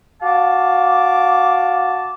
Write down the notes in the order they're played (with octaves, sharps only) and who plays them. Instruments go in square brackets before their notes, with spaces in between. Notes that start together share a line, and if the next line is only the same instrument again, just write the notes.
[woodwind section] F#4 F5 A5 D6